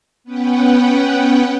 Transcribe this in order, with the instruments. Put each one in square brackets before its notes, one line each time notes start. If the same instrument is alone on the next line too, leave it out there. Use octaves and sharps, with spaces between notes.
[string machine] B3 C#4 B4 F#5 G5